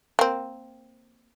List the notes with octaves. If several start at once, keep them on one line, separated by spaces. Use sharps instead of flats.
A#3 C4